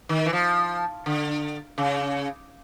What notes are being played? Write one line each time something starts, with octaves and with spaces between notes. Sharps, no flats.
D#3
E3
F3
D3
C#3